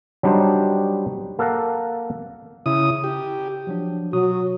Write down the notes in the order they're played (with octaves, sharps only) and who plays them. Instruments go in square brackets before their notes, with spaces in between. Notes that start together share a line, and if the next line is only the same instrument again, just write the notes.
[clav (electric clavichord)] F#3 G3 D4 D#4 G4 C5
A#3 A4 F5 F#5 A#5
[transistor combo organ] C#3 E4 D#6
G4
[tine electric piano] F3 F#3 D4
[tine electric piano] B2 F#4 D#6 [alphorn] F#3